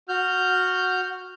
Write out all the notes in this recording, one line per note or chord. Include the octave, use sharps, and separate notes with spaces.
F#4 F6 G6